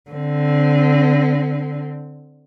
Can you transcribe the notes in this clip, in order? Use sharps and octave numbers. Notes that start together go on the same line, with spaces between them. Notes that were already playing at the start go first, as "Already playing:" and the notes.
D3 C4